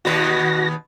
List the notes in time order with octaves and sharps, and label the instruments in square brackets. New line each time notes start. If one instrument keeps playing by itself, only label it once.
[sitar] D#2 B2 B4 [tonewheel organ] F#4 A#6